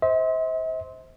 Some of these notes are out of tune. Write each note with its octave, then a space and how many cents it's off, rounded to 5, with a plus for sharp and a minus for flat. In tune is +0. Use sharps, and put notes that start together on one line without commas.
C5 +0 E5 -45 C6 +0